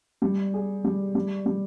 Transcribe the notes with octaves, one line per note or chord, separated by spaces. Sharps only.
G3
G#4
G3
G3
G3